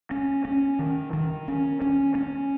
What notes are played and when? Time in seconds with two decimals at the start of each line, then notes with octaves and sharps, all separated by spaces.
0.11 C#4
0.45 C#4
0.79 D#3
1.13 D#3
1.48 C#4
1.82 C#4
2.15 C#4